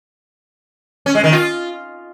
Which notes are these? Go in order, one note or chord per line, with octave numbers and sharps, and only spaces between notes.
C#4
G#3
D#3
F4